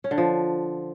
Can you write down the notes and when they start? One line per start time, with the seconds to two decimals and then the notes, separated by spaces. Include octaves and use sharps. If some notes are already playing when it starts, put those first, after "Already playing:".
0.04 C#4
0.11 D3
0.18 F3